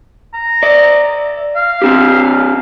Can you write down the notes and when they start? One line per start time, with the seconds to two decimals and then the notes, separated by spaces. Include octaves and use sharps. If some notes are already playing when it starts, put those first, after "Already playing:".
0.34 A#5
0.63 D5 E5
1.56 F5
1.82 C4 D4 G4